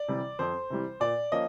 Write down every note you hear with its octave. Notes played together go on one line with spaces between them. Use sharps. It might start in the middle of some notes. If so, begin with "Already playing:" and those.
Already playing: D5
C3 E3 G3
F2 C5
C3 E3 G3
A#2 D5
F3 A#3 C#4 D#5